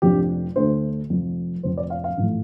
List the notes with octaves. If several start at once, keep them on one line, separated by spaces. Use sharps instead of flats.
F1 F2 F3 D4 G4
D2 D3 A3 D4 C5
F1 F2 F3
F1 F2 F3 C4 C5
D5
F5
F5
A1 A2 F3 A3